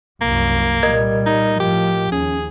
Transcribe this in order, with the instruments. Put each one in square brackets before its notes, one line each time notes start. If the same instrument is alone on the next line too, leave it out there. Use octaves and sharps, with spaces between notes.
[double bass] C2 F#2 [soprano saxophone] A#3
[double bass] A#2 G3 [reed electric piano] A#4 D#5 G#6
[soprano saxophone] D#4
[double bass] A2 F3 [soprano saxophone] G4
[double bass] D#2 [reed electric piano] C#4 [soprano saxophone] G#4